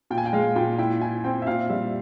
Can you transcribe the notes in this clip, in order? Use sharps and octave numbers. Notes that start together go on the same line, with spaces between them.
A#2 G5
G#5
G5
G#3 F5
A#2 G5
E4 G5
E4 G#5
C4 G5
E5
A#2 F5
G3 E5